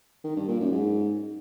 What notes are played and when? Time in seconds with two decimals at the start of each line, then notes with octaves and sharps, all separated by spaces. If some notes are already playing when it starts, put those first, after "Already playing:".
0.24 D#3
0.36 G2
0.48 A#2
0.60 F#2
0.72 G#2